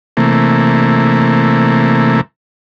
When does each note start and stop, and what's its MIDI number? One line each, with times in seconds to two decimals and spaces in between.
0.17 2.21 48
0.17 2.21 52
0.17 2.21 57
0.17 2.21 58